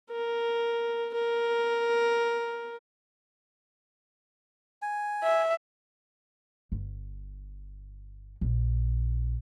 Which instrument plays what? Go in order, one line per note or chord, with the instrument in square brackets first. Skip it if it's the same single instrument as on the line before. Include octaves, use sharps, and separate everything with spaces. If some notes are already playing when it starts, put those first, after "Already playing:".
[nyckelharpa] A#4
A#4
[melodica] G#5
[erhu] E5
[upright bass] G1
A#1